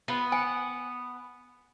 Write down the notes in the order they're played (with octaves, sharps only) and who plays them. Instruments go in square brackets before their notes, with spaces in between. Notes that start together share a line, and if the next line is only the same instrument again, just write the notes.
[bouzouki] B3 [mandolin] F4 B4
[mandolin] F#5 [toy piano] G#5